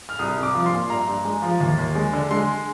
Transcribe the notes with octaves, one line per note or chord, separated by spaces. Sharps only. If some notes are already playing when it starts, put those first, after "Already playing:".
F6
C2 D#6
C2
D6
F3
C6
A#2
G2 A#5
G2
G#3
F3
D#2
D#2
G#3
D3
G#3 C6